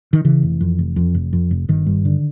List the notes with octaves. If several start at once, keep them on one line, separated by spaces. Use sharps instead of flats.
D#3
C#3 E3
F1
F2
F1
F2
F1
F2
F1
G1 D#3
G2
D3